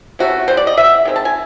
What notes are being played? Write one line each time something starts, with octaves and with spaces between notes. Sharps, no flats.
C3 E3 A3 C#4 F#4
E3 G3 B3 C5
D5
D#5
E3 G3 B3 E5
D#3 G#3 C4
A5
G#5